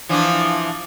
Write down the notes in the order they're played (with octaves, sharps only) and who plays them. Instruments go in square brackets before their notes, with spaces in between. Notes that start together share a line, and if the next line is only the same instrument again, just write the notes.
[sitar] E3 F3 D4